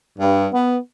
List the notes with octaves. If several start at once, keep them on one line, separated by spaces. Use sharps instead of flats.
G2
B3